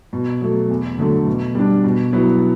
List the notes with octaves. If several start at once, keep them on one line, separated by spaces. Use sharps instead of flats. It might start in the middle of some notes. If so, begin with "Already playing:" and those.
B2
F#3 A3
E2
D3 F#3 A3
B2
G3 D4
B2
F#3 B3 E4